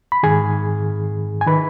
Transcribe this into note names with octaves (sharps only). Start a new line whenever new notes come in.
B5
G#2 D#3 G#4 G#5
G#5
D#3 B4 B5